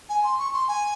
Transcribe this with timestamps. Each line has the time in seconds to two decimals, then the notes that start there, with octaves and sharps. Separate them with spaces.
0.09 G#5
0.24 C6
0.38 C#6
0.53 C6
0.68 G#5